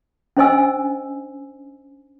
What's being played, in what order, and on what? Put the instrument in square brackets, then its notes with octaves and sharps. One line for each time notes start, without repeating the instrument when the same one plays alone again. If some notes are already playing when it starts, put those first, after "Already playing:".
[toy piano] C#4 D4 C5 D#5 G#5 E6